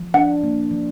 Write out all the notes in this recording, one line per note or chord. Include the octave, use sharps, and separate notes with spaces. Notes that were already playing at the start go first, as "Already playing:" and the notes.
Already playing: F3
D4 F#5
A#3
F3